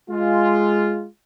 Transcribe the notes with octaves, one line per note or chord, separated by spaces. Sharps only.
G#3 F4